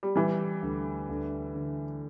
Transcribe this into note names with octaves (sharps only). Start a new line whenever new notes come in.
G3
E3 G3
D2
D2
D3